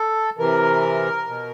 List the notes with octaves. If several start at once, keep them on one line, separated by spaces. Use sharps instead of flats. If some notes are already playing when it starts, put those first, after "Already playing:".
Already playing: A4
C3 E3 A#4
B2